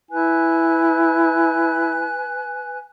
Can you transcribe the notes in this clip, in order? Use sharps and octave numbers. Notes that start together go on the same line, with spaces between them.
E4 B4 G#5 F#6